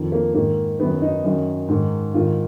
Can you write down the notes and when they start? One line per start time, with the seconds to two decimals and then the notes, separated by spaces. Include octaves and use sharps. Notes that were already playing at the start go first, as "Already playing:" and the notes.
Already playing: F2 D#3
0.12 A#3
0.34 G#2 D#3 A#3
0.79 D#3 B3
0.83 F#2
1.02 D#4
1.24 F#2 D#3
1.69 G#2 D#3
2.14 G#2 D#3 F4